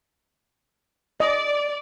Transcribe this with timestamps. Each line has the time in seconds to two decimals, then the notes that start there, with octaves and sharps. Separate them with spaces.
1.20 D5 D#5